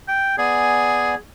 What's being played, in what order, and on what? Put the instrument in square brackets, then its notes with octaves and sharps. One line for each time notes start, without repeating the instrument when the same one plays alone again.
[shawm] G5
[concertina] B3 D5 G#5 [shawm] G#4